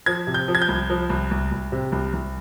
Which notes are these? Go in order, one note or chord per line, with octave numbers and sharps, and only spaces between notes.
F3 G#6
C3
G6
F3
G#6
G6
C2
F3
C2
C2
C2
C3
C2
C2